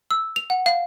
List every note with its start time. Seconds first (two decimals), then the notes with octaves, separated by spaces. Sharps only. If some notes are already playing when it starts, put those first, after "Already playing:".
0.11 E6
0.36 F7
0.50 F#5
0.66 F5